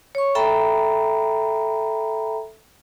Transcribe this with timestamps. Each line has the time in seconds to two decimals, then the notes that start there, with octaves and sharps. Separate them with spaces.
0.15 C#5 C#6
0.35 A4 E5 G5 A#5 B5